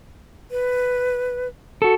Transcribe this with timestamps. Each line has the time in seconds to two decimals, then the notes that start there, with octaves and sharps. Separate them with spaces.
0.51 B4
1.82 F#4 A4